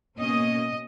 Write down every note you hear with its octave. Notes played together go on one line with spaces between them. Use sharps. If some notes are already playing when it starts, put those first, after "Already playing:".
B2 A#3 C#4 D#5